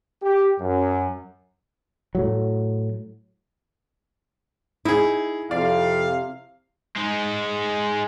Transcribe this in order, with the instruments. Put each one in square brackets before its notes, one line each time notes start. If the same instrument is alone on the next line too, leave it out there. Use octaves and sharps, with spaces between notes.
[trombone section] G4
F#2
[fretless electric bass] A2 F#3
[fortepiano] D#4 G#4 [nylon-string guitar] E4
[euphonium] F2 [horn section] C3 F5 [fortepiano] D5
[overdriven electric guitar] G#3 D#4